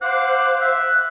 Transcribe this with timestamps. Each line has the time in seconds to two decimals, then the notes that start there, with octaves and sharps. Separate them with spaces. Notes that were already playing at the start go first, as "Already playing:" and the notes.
0.02 C5 F5 F#5 D6
0.61 E5 F#6